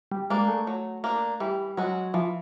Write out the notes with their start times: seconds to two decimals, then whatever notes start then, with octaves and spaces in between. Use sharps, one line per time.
0.12 G3
0.30 G#3 A#3 D4
0.48 A3
0.67 F#3
1.04 A#3 D4
1.40 E3 G3
1.77 F#3 G#3 C#4 F#4
2.14 E3 F3